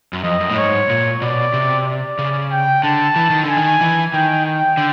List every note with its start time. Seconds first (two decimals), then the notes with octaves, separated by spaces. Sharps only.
0.13 F#2
0.24 F2 D#5
0.40 F#2
0.50 A2
0.56 G#2 C#5
0.89 A#2
1.21 B2 D5
1.53 C3
1.86 D5
2.18 C#3
2.51 G5
2.83 D3 A5
3.16 E3
3.30 D#3
3.44 D3 G#5
3.57 D#3
3.81 E3
4.13 D#3 G5
4.46 G5
4.77 D3